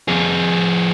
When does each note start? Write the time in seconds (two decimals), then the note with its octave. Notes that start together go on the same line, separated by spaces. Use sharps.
0.08 F2 G#4